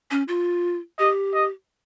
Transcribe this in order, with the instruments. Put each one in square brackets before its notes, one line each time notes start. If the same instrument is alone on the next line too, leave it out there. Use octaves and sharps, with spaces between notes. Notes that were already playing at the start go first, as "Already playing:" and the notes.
[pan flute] C#4
F4
[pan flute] G4 [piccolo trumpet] D#5
[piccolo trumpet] D#5